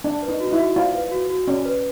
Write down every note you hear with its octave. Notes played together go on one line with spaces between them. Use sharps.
D4 D5
B4
D#4
F#4
D#4
E4
F#4
F4 D5
B4
F#4
F#4
C#4 D5
B4